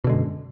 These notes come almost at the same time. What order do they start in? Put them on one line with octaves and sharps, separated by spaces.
B2 D3 G#3 F#2